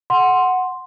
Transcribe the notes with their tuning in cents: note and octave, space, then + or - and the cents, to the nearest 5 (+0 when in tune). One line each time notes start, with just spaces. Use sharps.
F#5 +0 C6 +0